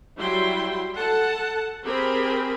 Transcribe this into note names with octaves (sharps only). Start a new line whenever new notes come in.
F#3 G3 E4 G5 C6
A4 F#5 A5
C4 G4 G#4 A#4 B5